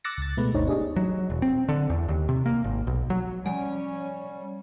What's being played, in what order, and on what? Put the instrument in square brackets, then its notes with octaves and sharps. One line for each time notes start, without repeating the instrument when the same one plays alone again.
[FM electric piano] D6 E6 F#6 A6 A#6 C#7
C#2 A6
B2 G#3 A3 B3 B4
G1 D2 D3 D#4 C5 C#5
D4 G4 G#4 D#5
[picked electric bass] F#3
E1
C4
D3
E2
D#2
C3
A#3
G#1
B1
F#3
[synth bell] F3 F#5 [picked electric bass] G3 [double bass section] C#4 [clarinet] G#5